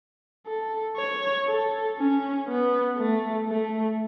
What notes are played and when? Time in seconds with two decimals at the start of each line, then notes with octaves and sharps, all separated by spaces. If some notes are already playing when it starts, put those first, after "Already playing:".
0.47 A4
0.97 C#5
1.47 A4
1.98 C#4
2.48 B3
2.98 A3
3.49 A3